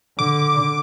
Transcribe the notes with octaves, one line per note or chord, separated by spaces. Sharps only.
D3 D6